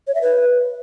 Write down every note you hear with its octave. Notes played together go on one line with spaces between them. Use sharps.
C#5
E5
B4